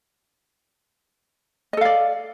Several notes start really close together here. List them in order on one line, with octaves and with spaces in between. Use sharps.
D#5 A4 F5 D5